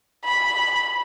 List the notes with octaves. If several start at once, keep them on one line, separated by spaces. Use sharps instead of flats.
B5